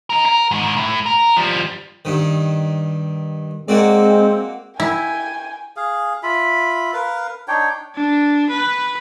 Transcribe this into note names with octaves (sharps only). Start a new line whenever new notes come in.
D#4 A#4
A#4
G#2 D#3
A2
A#4
F3 G3
G2 D#3
G#3 A#3 C4 F#4 D5
E4 G5 G#5
G#4 F5
F4 E5 B5
A#4 B4 F5
D4 D#4 C#5 G5
D4
B4